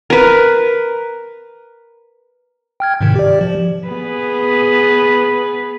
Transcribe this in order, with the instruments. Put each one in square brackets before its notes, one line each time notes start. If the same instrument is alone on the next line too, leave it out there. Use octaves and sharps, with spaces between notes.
[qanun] A#4 B4
[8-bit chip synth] G5 F6 G#6
G#2 C3 D#3
G4 D5
F3
[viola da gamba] B3 G#4 B4